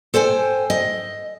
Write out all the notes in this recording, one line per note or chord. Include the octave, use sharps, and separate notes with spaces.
A4 C5 G5 G#5
D#5